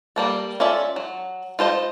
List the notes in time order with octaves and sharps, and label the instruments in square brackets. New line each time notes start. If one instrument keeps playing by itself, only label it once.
[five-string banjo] G3 A#3 A4
C#4 F4 A4 D5 E5
F#3
F4 A4 C5 D#5